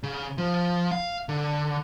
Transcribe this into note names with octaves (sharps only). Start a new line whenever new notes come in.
C#3
F3
F5
D3